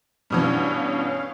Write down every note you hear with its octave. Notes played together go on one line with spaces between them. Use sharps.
G2 B2 E3 C#4 C#5 F5